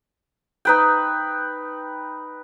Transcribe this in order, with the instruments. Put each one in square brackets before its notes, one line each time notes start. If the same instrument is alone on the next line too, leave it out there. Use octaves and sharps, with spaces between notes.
[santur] D#4 B4 G5